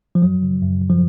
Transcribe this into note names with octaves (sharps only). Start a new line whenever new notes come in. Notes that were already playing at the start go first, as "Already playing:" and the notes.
F3
F#2 F#3
C#3
F#2
F#2
F3